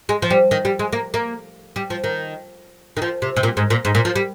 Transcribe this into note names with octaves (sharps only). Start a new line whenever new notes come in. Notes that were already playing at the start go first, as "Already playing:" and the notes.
G#3
F3
G3
D#3
G3
G#3
A#3
A#3
G3
F3
D#3
D#3
F3
C3
C3
A#2
G#2
A#2
G#2
A#2
F3
G3